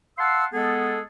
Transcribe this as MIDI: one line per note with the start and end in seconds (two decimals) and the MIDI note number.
0.18 0.45 77
0.18 0.45 78
0.18 0.45 81
0.18 0.45 84
0.18 0.45 88
0.53 1.00 56
0.53 1.00 59
0.53 1.00 68
0.53 1.00 69